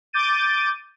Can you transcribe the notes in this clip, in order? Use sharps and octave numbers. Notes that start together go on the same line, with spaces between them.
D6 G6 A6 D#7